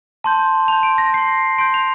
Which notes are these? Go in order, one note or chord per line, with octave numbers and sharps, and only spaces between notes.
A5 C6 G6
A5 C6 G6 F7
D7
A#6
C6 G6 C7
C6 G6 D7
F7